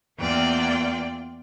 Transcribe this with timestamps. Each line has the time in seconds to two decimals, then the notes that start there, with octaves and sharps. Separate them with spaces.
0.19 E2 A#3 F4 D5 G5